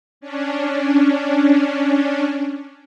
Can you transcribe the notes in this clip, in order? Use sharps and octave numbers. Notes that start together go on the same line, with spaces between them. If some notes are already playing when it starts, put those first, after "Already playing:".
C#4 D4